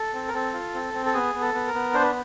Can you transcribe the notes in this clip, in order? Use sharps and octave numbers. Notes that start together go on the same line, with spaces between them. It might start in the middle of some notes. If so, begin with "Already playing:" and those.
Already playing: A4
C4
A#4
C4 A4
F4
C4
C4
A4
B3 G#4
B3
A4
B3
A#4
B3
D4 C5
B4